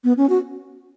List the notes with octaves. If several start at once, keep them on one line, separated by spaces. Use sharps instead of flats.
B3
C#4
F#4